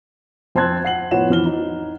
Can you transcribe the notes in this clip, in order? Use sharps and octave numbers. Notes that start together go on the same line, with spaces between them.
F2 C4 A5 C6 F#6 G#6
F#5 C7 F#7
A2 F3 B3 C#5 F#5 E7
F2 E3 F6 G7
D#4